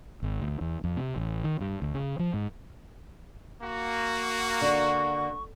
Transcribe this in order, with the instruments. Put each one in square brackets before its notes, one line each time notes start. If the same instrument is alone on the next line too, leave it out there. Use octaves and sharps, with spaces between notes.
[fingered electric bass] G#1
D2
E2
F2
C3
A1
D#3
G2
D2
C#3
F3
G#2
[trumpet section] A#3 F#4
[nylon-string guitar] D3 [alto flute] C#6